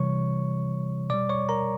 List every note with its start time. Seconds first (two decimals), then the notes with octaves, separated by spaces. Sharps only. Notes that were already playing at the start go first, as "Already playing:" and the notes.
Already playing: C3 E3 G3 C#5 C#6
1.10 B2 G3 D5 D6
1.29 C#5 C#6
1.49 A#4 A#5